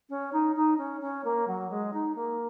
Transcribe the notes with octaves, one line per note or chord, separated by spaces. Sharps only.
C#4
D#4
D#4
C#4
C#4
A#3
F#3
G#3
D#4
A#3